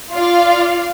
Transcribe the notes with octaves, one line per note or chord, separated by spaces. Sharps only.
F4 D5 F5